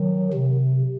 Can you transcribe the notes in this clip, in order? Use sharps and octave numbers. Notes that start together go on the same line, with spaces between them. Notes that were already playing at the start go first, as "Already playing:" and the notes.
Already playing: D#3 F#3
C3